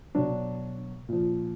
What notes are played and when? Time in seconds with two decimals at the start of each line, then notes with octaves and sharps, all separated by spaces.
0.15 B2 F#3 D4
1.09 A#2 F3